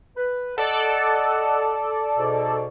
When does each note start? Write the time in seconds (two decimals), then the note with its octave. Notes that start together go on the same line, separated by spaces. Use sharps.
0.17 B4
0.58 A4 D5 D#5 F#5 A5
2.18 G#2 B2